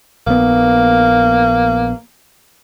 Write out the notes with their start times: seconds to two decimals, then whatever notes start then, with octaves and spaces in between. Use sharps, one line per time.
0.27 A#1 A#3 B3